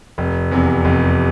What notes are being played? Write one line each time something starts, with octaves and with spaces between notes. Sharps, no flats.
F1
E2 C3
F1